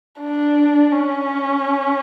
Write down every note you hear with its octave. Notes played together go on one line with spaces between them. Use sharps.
D4
C#4